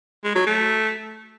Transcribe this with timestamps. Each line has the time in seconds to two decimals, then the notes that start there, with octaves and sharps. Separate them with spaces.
0.24 G#3
0.36 F#3
0.47 A3